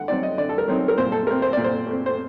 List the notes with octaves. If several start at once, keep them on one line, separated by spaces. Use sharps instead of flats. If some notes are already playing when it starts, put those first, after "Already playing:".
Already playing: D3 F#5
F#3 C4 D#4 D5
D#5
D3 D5
A4
A#4
F#3 C4 D#4
A#4
A#2 C5
A4
A3 C4 A#4
C5
A#2 D5
C5
A3 C4
C5